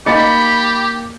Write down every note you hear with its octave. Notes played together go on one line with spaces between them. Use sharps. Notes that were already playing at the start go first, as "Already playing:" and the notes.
A#3 D#4 G4 D#5 B5 A6 C#7